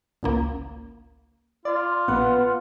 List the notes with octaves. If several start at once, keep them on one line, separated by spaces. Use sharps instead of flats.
G#1 C#2 A#3
F4 D5
A#1 B3 F#5